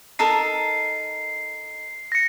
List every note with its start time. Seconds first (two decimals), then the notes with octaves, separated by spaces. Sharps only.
0.19 D#4 A4 A#4 C7
2.12 A#6 C#7